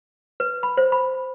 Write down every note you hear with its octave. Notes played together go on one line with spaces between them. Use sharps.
B4
B5
C5
B5